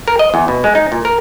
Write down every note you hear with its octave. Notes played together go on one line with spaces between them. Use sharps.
A#4
D#5
E2
B2
G#3
D#4
A#2
A#4